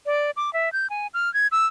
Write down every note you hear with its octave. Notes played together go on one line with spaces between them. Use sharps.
D5
D6
E5
G6
G#5
F6
G#6
E6